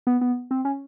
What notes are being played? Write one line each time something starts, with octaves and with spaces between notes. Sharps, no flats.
B3
B3
C4
C#4